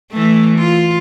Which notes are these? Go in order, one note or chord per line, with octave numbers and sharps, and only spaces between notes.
E3 A3
F4